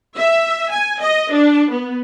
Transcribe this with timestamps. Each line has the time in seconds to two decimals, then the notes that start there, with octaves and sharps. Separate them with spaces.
0.16 E5
0.71 G#5
1.00 D#5
1.31 D4
1.70 B3